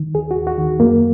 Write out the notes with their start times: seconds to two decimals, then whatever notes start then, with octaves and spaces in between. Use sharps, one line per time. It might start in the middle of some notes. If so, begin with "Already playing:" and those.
Already playing: D#3
0.15 D#2 G#4
0.31 F#4
0.36 D#2
0.47 F#4
0.58 D#3
0.79 F#2 A#3